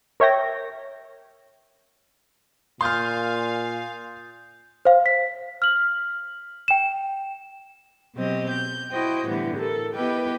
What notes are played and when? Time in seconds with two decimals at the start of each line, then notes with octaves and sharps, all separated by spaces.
0.20 A#4 C#5 E5 G5 A#6
2.81 A#2 F5 G#5 C6 D#6 F6 G6 A6
4.85 C5 F5
5.06 B6
5.62 F6 F#7
6.68 G5 E7
8.15 B2 F#3 C4 G4 D#5
8.50 G6
8.91 E4 F#4 C5 D#5 G5
9.27 A2 D3 E3 G3 B3
9.57 A4 A#4
9.95 B3 E4 G4 B4 D#5 G5